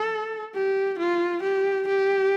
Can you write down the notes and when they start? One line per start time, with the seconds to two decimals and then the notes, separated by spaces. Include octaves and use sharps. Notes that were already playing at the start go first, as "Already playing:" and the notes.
Already playing: A4
0.54 G4
0.99 F4
1.43 G4
1.88 G4